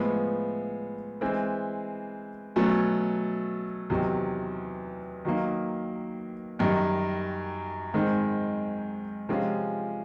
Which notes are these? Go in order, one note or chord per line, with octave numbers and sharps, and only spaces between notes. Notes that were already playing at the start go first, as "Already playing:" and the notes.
Already playing: A2 F3 G#3 B3
E3 G#3 C4 E4
B2 F#3 A3 C#4
E2 C3 D#3 F#3
D#3 F#3 A#3 D#4
F#2 D#3 G3
G#2 D#3 G#3 C4
C3 F3 G#3 C#4 F4